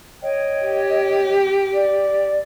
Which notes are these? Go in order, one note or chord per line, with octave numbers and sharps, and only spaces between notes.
C#5 D#5 G5
G4
D5